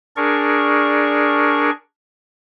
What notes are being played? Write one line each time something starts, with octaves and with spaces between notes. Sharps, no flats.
D4 G#4 A#4 D5 C#6